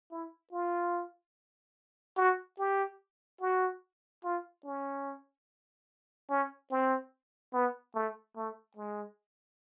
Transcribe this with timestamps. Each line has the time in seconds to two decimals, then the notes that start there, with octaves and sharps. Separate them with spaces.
0.11 E4
0.53 F4
2.17 F#4
2.59 G4
3.41 F#4
4.24 F4
4.65 C#4
6.30 C#4
6.71 C4
7.53 B3
7.95 A3
8.36 A3
8.77 G#3